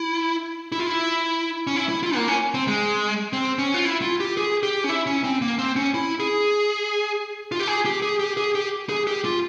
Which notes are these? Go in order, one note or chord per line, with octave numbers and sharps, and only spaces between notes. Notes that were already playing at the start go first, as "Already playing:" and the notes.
Already playing: E4
E4
F4
E4
C#4
E4
E4
F4
A#3
C#4
C4
G#3
C4
C#4
F4
E4
F4
G4
G#4
G4
C#4
E4
C#4
C4
A#3
C4
C#4
E4
G#4
F4
G4
G#4
G4
G#4
G4
G#4
G4
G#4
G4
F4